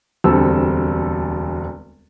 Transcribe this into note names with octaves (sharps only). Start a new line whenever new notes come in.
E1 D2 G3 C4 A4 E6